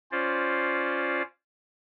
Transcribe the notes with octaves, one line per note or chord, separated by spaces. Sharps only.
C#4 F4 C5 D5